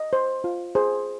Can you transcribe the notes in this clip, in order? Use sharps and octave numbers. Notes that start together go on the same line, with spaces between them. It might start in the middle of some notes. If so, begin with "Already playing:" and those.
Already playing: D#5
C5
F4
G#4 C5